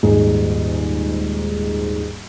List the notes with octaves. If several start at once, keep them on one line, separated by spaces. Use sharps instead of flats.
D#1 G#2 D#4 G#4